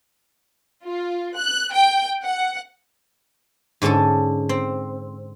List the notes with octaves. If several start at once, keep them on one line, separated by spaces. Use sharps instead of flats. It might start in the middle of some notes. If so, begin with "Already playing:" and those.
F4
F#6
G5
F#5
G#2 D3 C#4 D4 A4
C4